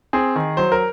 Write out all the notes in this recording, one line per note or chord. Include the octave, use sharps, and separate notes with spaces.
C4 G#4
D#3
F#3 C5
A#4